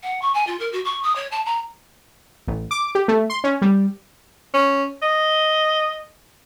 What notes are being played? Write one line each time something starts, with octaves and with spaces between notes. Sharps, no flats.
F#5
C#6
G#5
F4
A#4
F#4
C#6
D#6
C#5
A5
A#5
A1
D6
G4
A3
C6
C#4
G3
C#4
D#5